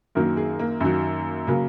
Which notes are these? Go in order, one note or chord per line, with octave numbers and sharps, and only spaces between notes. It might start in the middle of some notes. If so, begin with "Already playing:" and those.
F#2 D#3 F#3 A#3 A#4
G#4
A#3
F#2 D#3 F#3
C#3 F#3 A#3